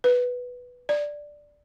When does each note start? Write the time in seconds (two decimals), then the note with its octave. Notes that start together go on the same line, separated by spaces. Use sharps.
0.04 B4
0.89 D5